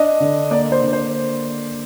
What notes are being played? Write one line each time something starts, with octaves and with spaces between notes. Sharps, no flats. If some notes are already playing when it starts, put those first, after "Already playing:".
Already playing: D4 D#5
D3
A#3 D5
C5
D3
C5